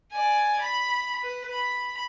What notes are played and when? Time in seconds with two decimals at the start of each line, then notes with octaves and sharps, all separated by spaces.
0.12 D5 G#5
0.62 B5
1.22 B4
1.51 B5